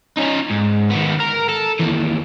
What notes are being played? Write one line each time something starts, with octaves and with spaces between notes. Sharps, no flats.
C#4 D#4
G#2
D#3 B3
A#4
A4
D#2 E3